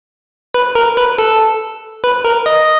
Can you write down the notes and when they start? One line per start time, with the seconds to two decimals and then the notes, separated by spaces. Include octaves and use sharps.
0.54 B4
0.75 A#4
0.97 B4
1.18 A4
2.04 B4
2.25 A#4
2.46 D#5